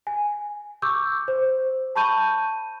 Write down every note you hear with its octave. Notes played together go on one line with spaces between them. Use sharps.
G#5
C#6 D6 E6 G6
C5
A5 B5 C#6 G6 D#7